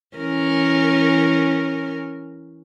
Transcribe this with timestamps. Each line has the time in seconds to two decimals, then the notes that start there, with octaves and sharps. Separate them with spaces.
0.17 E3 C#4 A#4